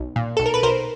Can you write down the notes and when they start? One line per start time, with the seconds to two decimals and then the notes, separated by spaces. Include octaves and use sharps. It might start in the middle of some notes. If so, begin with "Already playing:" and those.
Already playing: B1
0.16 A#2
0.37 B1 A4
0.46 A#4
0.54 B4
0.63 B1 A#4 C5